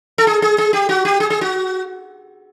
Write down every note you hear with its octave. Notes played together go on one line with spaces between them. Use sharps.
A4
G#4
G#4
G#4
G4
F#4
G4
G#4
G#4
F#4